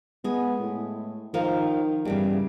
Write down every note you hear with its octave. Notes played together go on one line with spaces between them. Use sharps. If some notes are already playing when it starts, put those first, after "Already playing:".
G#3 B3 G#4
A2
D#3 F3 A#4 F5
E2 G2 C#3 G3